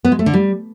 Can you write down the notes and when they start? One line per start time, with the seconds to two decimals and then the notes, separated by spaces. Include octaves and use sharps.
0.04 B3
0.12 G#3
0.19 A3
0.26 D3
0.34 G3